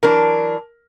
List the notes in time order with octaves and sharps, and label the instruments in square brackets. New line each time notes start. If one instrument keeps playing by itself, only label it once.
[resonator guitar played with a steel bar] E3 F#3 D4 [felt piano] A#4